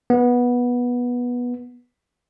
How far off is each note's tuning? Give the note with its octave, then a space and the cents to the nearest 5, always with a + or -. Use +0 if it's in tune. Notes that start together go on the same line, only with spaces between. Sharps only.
B3 -15